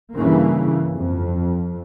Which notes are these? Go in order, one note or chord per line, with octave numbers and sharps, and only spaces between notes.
G2 C#3 E3 A#3
F2